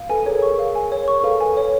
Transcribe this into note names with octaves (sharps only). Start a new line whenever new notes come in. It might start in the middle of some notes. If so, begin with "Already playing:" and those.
Already playing: F5
A4 B4 G#5
G#4 A#4 C#5
C#6
F5
G#5
C#5
C#6
A4 B4 F5
G#5
C#5